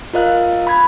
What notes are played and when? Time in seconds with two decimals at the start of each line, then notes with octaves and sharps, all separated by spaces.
0.13 F4 A#4 D#5 F5 F#6
0.67 B5 G#6